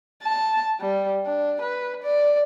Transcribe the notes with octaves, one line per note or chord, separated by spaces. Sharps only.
A5
G3
D4
B4
D5